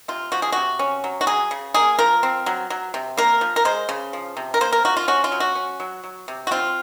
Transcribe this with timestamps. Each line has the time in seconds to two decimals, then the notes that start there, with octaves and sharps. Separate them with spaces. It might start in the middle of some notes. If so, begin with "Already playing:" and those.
0.08 C3 F4
0.32 F3 F#4
0.42 G#4
0.52 C3 F#4
0.79 C#4
1.04 F#3
1.21 F#4
1.27 F#3 G#4
1.51 C#3
1.74 A#3 G#4
1.99 F3 A#4
2.23 C4
2.46 F#3
2.70 F#3
2.94 C3
3.17 A#3 A#4
3.41 F3
3.56 A#4
3.65 G#3 C5
3.89 C#3
4.13 F3
4.37 C3
4.54 A#4
4.61 A#3 C5
4.72 A#4
4.85 F3 F#4
4.97 F4
5.08 C#4 F#4
5.24 F4
5.32 F#3
5.40 F#4
5.55 C#4
5.80 F#3
6.04 F#3
6.28 C3
6.47 F#4
6.51 C4 F4